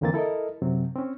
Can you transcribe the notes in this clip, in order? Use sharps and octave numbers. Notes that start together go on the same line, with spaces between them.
F2 D3 E3 A#3 C4 A6
E4 A4 A#4 D#5
F#2 C3 F#3 C4
C4 C#4